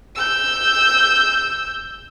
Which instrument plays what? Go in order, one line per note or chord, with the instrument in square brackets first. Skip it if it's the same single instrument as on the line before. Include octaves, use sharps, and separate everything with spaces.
[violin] E6 G6